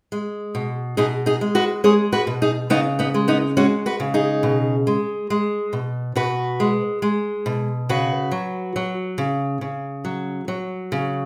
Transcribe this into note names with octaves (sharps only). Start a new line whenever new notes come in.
G#3
B2
B2 D#4 G#4
D#4 G#4
G#3
F#4 B4
G#3 G#4 C#5
F#4 B4
B2
D#4 G#4
C#3 B3 D#4
B3 D#4
G#3
B3 D#4
G#3 C#4 F#4
F#4 B4
C#3
D#4 G#4
B2
G#3
G#3
B2
B2 F#4 B4
G#3
G#3
B2
C#3 F#4 B4
F#3
F#3
C#3
C#3
F#3
F#3
C#3